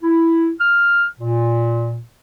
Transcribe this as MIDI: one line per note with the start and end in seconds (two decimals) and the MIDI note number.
0.02 0.51 64
0.60 1.05 89
1.20 2.00 46